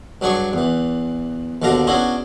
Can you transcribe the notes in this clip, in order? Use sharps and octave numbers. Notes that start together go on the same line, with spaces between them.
G2 F#3 D4 G#4 C#6
E2 E3
D#2 B2 D3 D4 F5 A#5
B3 C#4 D4 E4 F#4 G#4